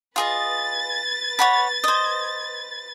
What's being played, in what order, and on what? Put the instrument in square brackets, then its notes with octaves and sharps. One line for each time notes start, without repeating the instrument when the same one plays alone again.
[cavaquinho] F4 G#4 D#5 [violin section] B4 A6
[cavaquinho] C#5 F#5 B5
C5 D#5